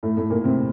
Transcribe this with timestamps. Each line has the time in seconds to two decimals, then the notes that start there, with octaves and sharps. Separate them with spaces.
0.03 A2 A3
0.17 A2 A3
0.30 A#2 A#3
0.44 C3 C4